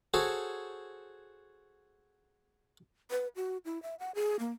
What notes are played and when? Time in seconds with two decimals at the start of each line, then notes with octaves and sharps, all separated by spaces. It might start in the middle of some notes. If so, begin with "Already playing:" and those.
0.14 F#4 G#4 A4 C5 C#5
3.11 B4
3.36 F#4
3.65 E4
3.83 E5
4.00 F#5
4.15 G#4
4.39 A#3